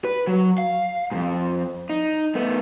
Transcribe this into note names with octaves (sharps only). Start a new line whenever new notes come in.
B4
F#3
F5
F2 G#2
D#4
A3 B3